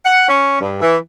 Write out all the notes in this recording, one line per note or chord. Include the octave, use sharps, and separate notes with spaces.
F#5
C#4
G2
E3